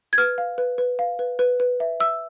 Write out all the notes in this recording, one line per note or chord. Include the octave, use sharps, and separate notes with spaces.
G#6
B4 F6
F5
B4
B4
F5
B4
B4
B4
E5
E5 E6